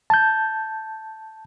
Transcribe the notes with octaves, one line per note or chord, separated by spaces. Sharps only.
A5 G6